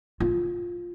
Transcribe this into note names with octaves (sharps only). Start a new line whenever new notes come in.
F4